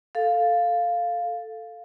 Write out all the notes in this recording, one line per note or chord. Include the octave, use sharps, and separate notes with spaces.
A4 F5